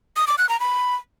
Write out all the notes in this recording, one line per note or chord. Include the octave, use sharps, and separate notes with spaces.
D#6
D6
F#6
A#5
B5